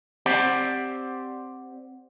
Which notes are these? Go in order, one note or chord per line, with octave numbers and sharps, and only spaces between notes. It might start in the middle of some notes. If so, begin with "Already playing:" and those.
C4 G4 C5 D5 F#5